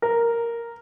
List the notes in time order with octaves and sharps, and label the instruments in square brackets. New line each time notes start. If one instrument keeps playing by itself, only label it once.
[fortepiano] A#4